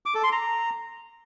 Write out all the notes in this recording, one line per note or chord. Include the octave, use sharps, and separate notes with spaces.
D6
A4
C6
A#5